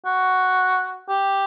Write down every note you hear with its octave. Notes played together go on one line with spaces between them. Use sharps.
F#4
G4